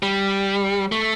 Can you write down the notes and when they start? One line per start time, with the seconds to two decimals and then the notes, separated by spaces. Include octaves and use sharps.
0.03 G3
0.92 A3